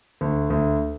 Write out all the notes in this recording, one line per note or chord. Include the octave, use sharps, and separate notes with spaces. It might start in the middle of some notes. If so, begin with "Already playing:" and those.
D2
D2